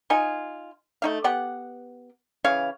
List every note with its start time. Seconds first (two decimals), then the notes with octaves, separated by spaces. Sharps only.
0.10 D#4 F4 G#5
1.02 A3 D#4 F5
1.24 B3 G4 F#5
2.44 C#3 E3 C#5 F5